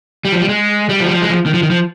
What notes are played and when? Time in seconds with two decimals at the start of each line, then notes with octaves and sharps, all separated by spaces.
0.25 G3
0.32 F3
0.41 G3
0.49 G#3
0.89 G3
1.00 F3
1.06 G3
1.11 F3
1.22 G#3
1.30 F3
1.46 D#3
1.54 F3
1.63 D#3
1.70 F3